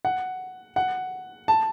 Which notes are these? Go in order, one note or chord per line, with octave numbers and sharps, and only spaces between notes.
F#5
F#5
A5